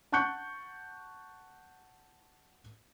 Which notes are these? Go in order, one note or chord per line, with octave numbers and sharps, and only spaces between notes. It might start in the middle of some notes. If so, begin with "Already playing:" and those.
F#5 A5 C#6 F#6 G6 C#7